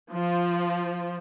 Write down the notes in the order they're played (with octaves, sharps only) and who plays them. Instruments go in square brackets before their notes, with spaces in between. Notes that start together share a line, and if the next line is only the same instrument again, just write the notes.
[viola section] F3